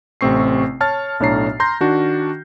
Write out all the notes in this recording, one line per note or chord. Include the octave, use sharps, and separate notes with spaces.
A1 C3 A3 C4 C#6 C7
C#5 A5 F6 A6
B1 A2 D4 C#5 A#5 C7
A#5 C6 G6 A#6
D#3 D4 F#4